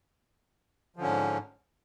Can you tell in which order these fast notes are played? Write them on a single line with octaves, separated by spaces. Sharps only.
F3 D3 C#4 G#2